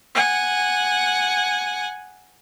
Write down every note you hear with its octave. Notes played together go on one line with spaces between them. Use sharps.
F#5 G#5